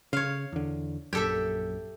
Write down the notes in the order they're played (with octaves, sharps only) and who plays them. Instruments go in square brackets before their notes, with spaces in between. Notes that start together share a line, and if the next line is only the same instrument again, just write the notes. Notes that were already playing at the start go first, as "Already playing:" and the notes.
[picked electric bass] C#3 [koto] C#5 F5
[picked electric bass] E2 D3
[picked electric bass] A#1 F#2 [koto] G4 A4 E5